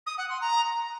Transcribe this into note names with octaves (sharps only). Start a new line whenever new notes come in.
D#6
F#5
C6
A#5